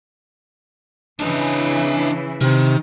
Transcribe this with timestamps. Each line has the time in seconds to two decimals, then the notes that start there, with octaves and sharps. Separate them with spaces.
1.20 C#3 E3 D4 E4 D#5
2.41 C3 D#3